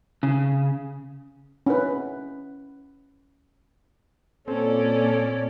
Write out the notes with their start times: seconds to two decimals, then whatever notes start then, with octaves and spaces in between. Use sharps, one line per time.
0.23 C#3
1.66 C#4 E4 B4
4.48 A#2 C4 C#4 A4 D5